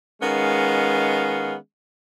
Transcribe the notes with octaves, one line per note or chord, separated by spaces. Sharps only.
D#3 G#3 B3 C#4 F5